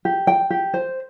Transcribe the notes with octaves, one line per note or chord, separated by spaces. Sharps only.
G4
G5
G4
C5